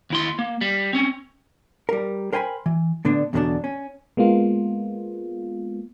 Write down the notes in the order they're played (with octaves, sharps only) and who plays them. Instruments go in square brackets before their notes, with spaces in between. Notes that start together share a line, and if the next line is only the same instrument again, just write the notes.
[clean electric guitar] D#2 E4 C6
A#3
G3
C4 C#4
[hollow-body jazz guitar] G3 A#4
A#4 C5 G5 G#5 A#5 B5
E3
A2 D3 B3 D4
E2 B2 D3 F3 F#3 D4
C#4
[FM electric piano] G#3 A#3 B3 F4